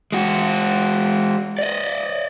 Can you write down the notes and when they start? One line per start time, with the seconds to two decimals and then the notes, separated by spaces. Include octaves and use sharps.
0.12 G#3 F#4
1.59 D5 D#5